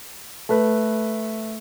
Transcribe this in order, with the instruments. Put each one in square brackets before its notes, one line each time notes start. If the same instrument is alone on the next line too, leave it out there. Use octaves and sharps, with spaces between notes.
[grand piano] A3 B4